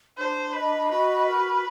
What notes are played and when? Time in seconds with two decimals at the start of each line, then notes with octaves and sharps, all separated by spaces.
0.17 D4 C5
0.53 B4 D#5
0.90 F#4 B4
1.26 A#4